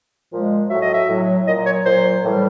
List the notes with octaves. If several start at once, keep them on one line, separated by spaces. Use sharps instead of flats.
A#2 F3 G#3
A2 F#3 E5
D#5
E5
A2 F#3
A#2 F#3 D#5
C#5
A#2 F#3 C5
A2 E3 G3